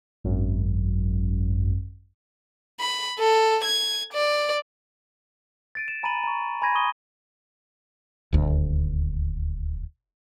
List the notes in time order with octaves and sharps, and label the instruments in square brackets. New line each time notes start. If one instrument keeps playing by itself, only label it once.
[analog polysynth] G#1 F#2
[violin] B5
A4
G#6
D5
[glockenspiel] A6 D7 D#7
E7
G#5 A#5 B5 A6 D#7 F#7
A#5 C#6
G#5 B5 C6 G#6 A#6 D#7
A#5 C#6 D#6 D#7 G7
[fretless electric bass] D#1 D2